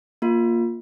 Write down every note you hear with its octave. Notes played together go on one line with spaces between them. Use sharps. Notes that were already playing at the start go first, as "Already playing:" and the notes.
A#3 F4